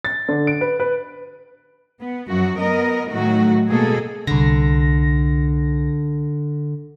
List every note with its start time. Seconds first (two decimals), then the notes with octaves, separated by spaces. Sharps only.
0.05 A6
0.28 D3
0.47 D7
0.61 B4
0.80 B4
2.00 B3
2.28 F#2 F3 F#4
2.59 B3 A#4 D#5
3.09 A2 D#3 F#3 A3 F#4
3.69 B2 G#3 A#3 G#4 A4
4.27 C2 D3 A#6